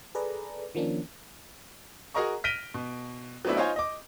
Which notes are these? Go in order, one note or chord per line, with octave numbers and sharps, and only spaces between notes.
G#4 A4 B4 D5 A#5
D#3 F3 A#3 C#4 D4
F#4 G#4 A#4 D#5 A#5 C#6
F6 A#6 B6 D7 D#7 G7
B2
F#3 A3 B3 C4 D4 E4
D#4 F4 C5 C#5 F5 G#5
D#5 D6